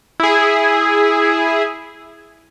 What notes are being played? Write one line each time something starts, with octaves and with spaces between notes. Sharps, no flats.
E4 G#4